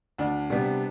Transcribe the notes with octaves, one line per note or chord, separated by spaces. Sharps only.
D2 D4
C3 G3 B3